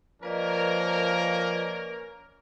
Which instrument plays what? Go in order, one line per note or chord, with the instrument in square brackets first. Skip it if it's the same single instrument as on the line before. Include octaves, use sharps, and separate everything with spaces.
[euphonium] F3 [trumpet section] A#3 C#4 A#4 [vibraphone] B4 D5 D#5